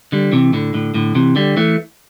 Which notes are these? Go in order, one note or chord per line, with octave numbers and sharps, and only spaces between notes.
D3 G3
C3 E3
A2 D3
A2 D3
A2 D3
C3 E3
D3 G3
E3 A3